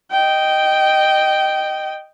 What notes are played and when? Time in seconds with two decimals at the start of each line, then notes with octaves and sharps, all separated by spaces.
0.12 D#5 G5